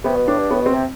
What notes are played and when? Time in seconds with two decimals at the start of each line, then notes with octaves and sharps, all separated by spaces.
0.04 C3 B3
0.16 B2
0.27 A2 D4
0.38 G2
0.50 A2 B3
0.61 B2 C4
0.74 C3